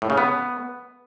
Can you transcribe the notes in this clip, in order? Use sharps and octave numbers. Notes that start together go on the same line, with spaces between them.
A2
C#3
B3